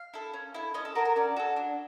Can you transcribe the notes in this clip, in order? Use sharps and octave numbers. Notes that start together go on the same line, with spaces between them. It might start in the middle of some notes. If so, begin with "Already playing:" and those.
Already playing: F5
E4 A4
C#4
E4 A4
C#4 D#5
A4
F#4 A4 A#4
A#4
C#4 D5
F#4 A4
D4